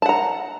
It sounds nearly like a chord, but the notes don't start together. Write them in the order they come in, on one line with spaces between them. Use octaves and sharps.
A5 F#5 A#5